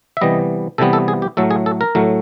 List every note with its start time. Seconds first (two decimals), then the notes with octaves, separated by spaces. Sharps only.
0.17 E5
0.21 C3 E3 G3 B3 D#5
0.78 C3 E3 G3 B3 A4
0.93 A4
1.08 G#4
1.22 G4
1.37 A2 F#3 A3 A4
1.51 G#4
1.66 A4
1.81 A#4
1.95 A2 F#3 A3